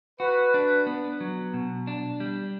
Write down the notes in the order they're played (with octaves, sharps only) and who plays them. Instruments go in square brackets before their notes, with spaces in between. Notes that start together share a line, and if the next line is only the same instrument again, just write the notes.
[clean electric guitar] F#4 [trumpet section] B4
[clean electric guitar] D4
B3
F#3
B2
D4
G3